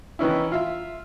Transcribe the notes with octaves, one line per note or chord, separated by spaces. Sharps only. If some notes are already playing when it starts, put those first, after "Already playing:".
D#3 E3 C#4 E4
F4 E5